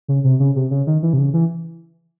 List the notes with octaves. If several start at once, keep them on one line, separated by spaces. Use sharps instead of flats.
C#3
C3
C#3
C3
C#3
D#3
E3
C3
C#3
E3